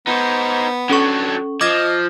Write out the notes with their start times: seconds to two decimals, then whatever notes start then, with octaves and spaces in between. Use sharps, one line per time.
0.07 B3 D#4 C5
0.90 F#3 C#4 D4 A4 C#6
1.61 F3 D#5 D6 G#6 A#6